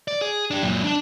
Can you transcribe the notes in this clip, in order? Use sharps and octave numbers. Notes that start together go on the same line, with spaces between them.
D5
G#4
D4 G4
F#2 A#2
D4 A5